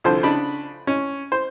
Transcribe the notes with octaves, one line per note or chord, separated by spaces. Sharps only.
C2 D3 F3 C5
C#3 D4 B5
C#4
C5